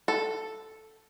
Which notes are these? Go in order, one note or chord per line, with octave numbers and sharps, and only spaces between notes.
A4